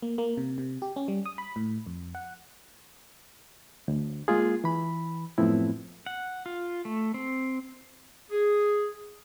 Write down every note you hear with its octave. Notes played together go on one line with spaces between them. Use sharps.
A#3
A#3
C3
C3
G4
C#4
G3
D#6
B5
A2
F2
F#5
D2
G#3 A#3 F4 G#4
E3 B5
F#2 A2 F3 B3 C4 E4
F#5
F4
A3
C4
G#4